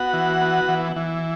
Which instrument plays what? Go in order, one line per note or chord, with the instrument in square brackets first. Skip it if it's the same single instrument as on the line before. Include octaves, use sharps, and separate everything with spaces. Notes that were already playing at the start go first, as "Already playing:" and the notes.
Already playing: [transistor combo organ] B3 F#4 F#5
E3
B3
E3
E3